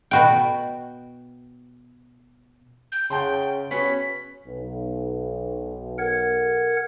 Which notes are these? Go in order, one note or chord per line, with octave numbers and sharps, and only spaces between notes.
B2 F#4 G5
G6
C#3 F#5 G5 A5 C6
B3 C#4 F#4 B6
B1
A#4 F#5 G#6